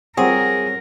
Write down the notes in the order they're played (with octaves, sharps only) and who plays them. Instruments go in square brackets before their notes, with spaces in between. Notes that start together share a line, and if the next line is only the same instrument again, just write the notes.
[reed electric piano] G3 C4 C#5 [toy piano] F4 F#5 [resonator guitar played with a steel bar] G#4 [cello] A#4